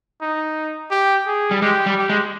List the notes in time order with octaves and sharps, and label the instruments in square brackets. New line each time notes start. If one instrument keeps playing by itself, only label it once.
[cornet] D#4
G4
G#4
[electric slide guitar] G3
[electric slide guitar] G#3 [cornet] G4
[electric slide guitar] G3
[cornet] G4
[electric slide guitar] G#3